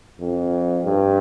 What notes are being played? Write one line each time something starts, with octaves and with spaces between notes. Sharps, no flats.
F2
G2